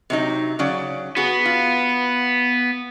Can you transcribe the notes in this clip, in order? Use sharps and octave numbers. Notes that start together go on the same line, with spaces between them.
C3 F#3 D#4
C#3 F#3 D5
B3 F#4 G#4
F4